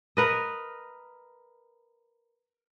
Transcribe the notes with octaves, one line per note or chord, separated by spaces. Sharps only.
A#4 B4 D#5